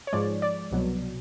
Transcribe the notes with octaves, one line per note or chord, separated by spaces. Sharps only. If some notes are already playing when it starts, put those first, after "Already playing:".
C#5
G#2 F3 G#3 D5
D5
C2 B2 F#3